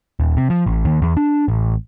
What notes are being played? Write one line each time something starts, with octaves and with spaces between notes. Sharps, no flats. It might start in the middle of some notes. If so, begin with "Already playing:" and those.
D#1
C3
F3
A1
D#2
E2
D4
A1